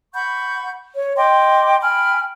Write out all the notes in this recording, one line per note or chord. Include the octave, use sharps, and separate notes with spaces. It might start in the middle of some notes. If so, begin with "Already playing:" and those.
F#5 B5 C#6 G6
C#5
D#5 G5 C6 D6
G5 G#5 B5 F6